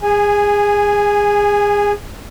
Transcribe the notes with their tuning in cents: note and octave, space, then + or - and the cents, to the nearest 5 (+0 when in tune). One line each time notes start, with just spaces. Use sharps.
G#4 -25 G#5 +0